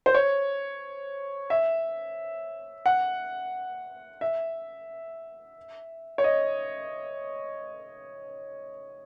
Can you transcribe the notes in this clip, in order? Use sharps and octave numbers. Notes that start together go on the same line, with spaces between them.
C5
C#5
E5
F#5
E5
C#5
D#5